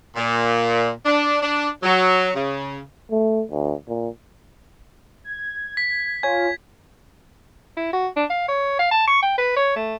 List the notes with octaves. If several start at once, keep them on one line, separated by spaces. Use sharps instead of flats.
A#2
D4
D4
F#3
C#3
A3
D2
A#2
G#6
B6
F4 C#5 G#5 G#6
E4
F#4
D4
F5
C#5
F5
A5
C#6
G5
B4
C#5
A3